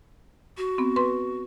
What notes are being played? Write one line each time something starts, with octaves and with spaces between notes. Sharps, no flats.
F#4
B3 C4
B4 C6